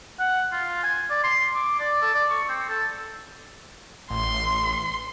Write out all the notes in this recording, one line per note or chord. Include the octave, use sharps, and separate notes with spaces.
F#5
F4
G#5
D5
C6
D6
D5
A4
D5
C#6
C4
A4
A1 C6